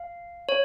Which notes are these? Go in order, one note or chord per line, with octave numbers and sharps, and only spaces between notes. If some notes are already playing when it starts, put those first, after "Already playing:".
Already playing: F5
C#5